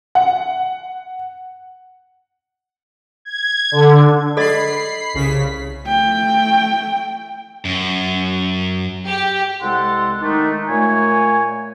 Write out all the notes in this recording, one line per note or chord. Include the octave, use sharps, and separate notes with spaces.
F#5
G#6
D3
A4 D5 D#5 B5 C7
C2 C#3 B6
A3 G5
F#2
G4
C2 G#3 A4 F#5 C6
D#3 G#3 A3 D4 D#4
A#2 A3 C#5 G#5